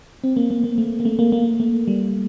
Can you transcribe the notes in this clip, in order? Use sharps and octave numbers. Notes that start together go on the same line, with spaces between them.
C4
A#3
A#3
A#3
A3
A#3
A3
A#3
A#3
A3
G3